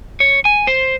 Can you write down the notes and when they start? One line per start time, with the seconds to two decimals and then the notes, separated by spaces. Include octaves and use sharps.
0.20 C#5
0.45 G#5
0.67 C5